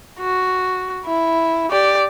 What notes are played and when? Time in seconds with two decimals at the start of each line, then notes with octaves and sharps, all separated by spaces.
0.20 F#4
1.06 E4
1.71 G4 D5